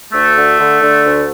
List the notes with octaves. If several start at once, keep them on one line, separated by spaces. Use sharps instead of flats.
D2 A3
D3
D3
D3
D2